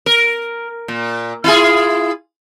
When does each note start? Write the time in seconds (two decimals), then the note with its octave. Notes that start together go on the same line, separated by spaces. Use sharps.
0.06 A#4
0.88 A#2
1.44 E4 F4 G#4